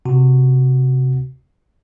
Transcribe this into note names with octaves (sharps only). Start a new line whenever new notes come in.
C3 F#4